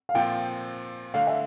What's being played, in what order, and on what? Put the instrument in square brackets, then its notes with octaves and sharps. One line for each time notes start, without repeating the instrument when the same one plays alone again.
[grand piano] F5
[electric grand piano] A#2 F3 C4 F4 [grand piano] G5
[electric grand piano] D3 A3 D4 [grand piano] F5
[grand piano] E5